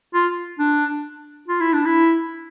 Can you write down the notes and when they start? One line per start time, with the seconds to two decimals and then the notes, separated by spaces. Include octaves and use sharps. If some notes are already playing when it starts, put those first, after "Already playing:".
0.14 F4
0.59 D4
1.48 F4
1.61 E4
1.73 D4
1.86 E4